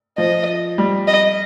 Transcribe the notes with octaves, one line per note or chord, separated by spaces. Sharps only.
F3 D#5
G3
D#5